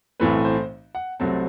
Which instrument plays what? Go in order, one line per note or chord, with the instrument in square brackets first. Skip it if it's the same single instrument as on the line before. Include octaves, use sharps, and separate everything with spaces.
[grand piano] B1 A2 E3 A3 C4 B4
C5
F#5
C2 C3 F#3 A3 C4 A5